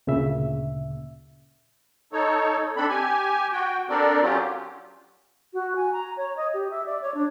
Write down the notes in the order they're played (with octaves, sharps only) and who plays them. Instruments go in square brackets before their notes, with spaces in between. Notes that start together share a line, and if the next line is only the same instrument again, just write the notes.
[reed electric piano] D2 A#2 C#3 E5
[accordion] D#4 A4 C#5
C4 D4 A4 B5
G4 G#5
F#4 G5
C4 D4 A4 A#4 D5
F#3 C#4 F4 G4
[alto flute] F#4
G#5
A#5
C#5
D#5
G4
E5
D5
C#5
D4